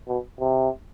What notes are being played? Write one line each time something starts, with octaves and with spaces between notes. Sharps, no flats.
B2
C3